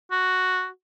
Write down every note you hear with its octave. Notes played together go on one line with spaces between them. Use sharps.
F#4